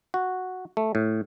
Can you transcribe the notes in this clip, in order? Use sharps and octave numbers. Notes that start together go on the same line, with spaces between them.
F#4
A3
A2